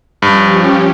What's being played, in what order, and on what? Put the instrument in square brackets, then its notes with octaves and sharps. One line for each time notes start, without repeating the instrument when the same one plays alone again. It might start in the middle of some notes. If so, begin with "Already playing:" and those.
[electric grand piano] G2 [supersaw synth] F3 C#4 G4